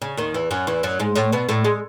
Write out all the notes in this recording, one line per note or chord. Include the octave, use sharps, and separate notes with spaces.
C#3
D#2 D#3
E2 E3
F#2 F#3
E2 E3
F#2 F#3
G#2 G#3
A2 A3
B2 B3
A2 A3
G#3